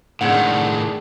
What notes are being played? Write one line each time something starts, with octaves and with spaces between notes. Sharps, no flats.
A2 D#3 G#3 C4 D4 G#4 F#5